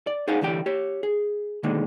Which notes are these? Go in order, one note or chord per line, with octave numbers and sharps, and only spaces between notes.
D5
D#4 G#4 C5 F5 F#5 G#5
C2 D3 E3 G4 G5
G4 C#5
G#4
B2 D3 D#3 G#3 A#3